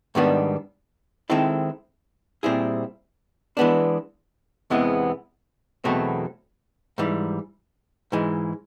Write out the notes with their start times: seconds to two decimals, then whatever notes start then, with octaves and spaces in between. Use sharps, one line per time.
0.15 G#2 D#3 G3 B3 D4
1.30 D#3 G#3 C4 E4 A4
2.43 A#2 G3 C4 E4 G#4
3.57 E3 G#3 B3 D4
4.70 E2 C3 E3 G#3 B3
5.84 E2 B2 F#3 A3 C4
6.98 G#2 E3 G3
8.12 G#2 E3 G#3